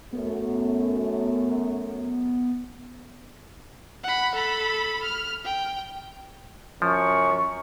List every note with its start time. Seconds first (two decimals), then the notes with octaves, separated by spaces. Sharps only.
0.12 F#2 A3 B3
4.04 F#5 B5
4.35 A4 B5
5.03 F6
5.45 G5
6.82 F#2 F3 C#6